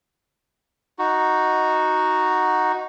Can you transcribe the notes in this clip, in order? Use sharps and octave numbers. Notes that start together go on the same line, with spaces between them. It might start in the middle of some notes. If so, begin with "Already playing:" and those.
D#4 F#4